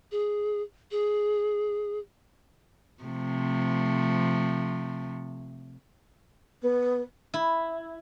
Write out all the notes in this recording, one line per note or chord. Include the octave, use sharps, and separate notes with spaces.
G#4
G#4
C3 F3 A3
B3
E4